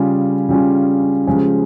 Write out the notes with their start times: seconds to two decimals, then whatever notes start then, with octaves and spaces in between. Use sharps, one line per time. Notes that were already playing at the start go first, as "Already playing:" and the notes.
Already playing: C#3 G3 C#4 F4
0.49 C#3 G3 C#4 F4
1.27 C#3 F3 G#3 C#4 G4